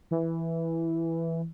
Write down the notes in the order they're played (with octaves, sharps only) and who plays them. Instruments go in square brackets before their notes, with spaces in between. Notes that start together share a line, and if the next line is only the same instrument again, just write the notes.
[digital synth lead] E3